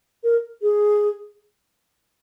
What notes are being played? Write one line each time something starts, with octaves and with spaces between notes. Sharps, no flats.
A#4
G#4